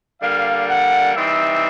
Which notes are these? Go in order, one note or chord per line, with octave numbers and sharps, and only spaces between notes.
D3 G3 A#3 F5
F#5
E3 G3 C4 D#4 E5